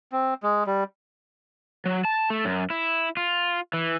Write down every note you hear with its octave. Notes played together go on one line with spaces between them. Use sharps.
C4
G#3
G3
F#3
A5
A3
F#2
E4
F4
E3